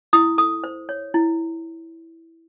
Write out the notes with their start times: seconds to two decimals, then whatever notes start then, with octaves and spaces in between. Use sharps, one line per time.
0.13 E4 D#6
0.38 A4 D#6
0.64 C5
0.89 C#5
1.14 E4